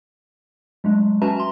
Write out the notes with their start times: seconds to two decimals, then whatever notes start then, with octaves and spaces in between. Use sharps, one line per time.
0.84 F#3 G#3 A3 D4
1.22 C#4 F#4 B4 E5 A5 A#5
1.36 A#5 C6